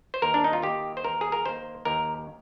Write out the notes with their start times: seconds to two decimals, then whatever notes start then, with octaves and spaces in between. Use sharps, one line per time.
0.14 C5
0.22 D#2 A#4
0.34 D4
0.44 D#4
0.53 F4
0.62 D#3 A#3 G4
0.97 C5
1.04 D#2 A#4
1.21 G#4
1.32 A#4
1.45 D#3 A#3 C5
1.85 D#2 A#4